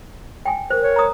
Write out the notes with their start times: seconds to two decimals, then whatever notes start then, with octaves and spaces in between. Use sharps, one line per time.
0.45 G5 G#5
0.70 A#4 C5
0.83 C#5
0.96 A#5 D#6